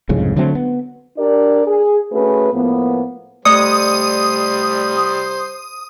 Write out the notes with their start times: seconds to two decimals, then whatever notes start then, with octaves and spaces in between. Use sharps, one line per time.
0.09 C2 F2 G#2 C#3
0.36 D3 F#3 A3 C4
0.55 B3
1.17 D4 G4 A#4 D5
1.67 G#4
2.12 A3 C#4 F#4 G#4 B4
2.53 A2 F3 A#3 B3
3.45 G3 A3 C5 D5 D#6 C#7